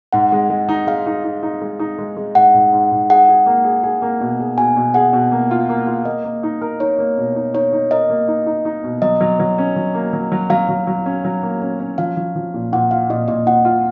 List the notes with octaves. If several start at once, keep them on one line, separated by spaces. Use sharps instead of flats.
G#2 F#5
G#3
G#3
D#4
G#3 F5
D#4
D#4
D#4
G#3
D#4
G#3
G#3
G#2 F#5
G#2
G#2
G#2
G#4 F#5
G#4
A#3
G#4
G#4
A#3
B2
G#4
B2 G#5
B2
G#4 F#5
B2
A#3
F4
A#3
F4
A#3 D#5
A#3
D#4
A#4
D#4 C#5
A#3
B2
D#4
D#4 C#5
D#4
A#4 D#5
A#3
D#4
D#4
D#4
B2
F#3 D#5
F#3
F#3
C#4
F#3
A#3
F#3
F#3
F#3 F5
F#3
F#3
C#4
F#3
A#3
C#4
C#4
F3 F5
F3
F3
A#2
A#2 F#5
F4 F5
A#2 D#5
A#2 D#5
A#2 F#5
F4